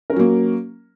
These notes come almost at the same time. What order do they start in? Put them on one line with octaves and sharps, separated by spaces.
A#4 C#4 F#3 A#3